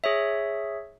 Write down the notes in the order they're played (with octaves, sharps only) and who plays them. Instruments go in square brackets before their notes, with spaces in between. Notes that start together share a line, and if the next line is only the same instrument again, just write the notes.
[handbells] G#4 C#5 E5